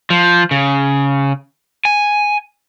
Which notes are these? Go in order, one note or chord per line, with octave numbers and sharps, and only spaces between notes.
F3
C#3
G#5